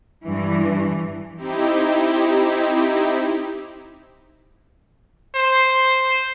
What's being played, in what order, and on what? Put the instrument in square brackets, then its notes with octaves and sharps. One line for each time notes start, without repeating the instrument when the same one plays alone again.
[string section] G2 E3
[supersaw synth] C4 D#4 E4 G4
[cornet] C5